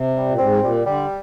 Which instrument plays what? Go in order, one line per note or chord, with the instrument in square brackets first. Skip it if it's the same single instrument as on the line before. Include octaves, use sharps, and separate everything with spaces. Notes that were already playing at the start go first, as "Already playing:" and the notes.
Already playing: [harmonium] C3
[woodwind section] G3
[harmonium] A#2
[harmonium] G#2 [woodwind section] C4
[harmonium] A#2 [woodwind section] G3
[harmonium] D3 [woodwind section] G3